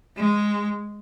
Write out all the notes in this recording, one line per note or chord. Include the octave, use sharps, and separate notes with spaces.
G#3